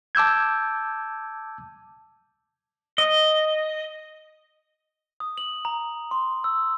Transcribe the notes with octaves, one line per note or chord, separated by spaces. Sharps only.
A5 D6 E6 G6 G#6
D#5
D#6
F#7
A#5
C6
E6